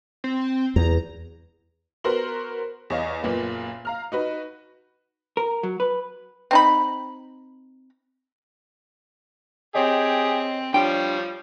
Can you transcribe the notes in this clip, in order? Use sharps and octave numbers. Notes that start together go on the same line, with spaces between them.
C4
E2 A#5
B3 F#4 A#4 C5 C6 F#7
E2 C#5 D#5 F5
F#1 A#2 A#3 B3
F5 A#5 F6
D#4 F#4 B4
A#4
F#3
B4
C4 D#4 B5
C4 G4 G#4 C#5 D#5
F3 G3 D4 C#5 G5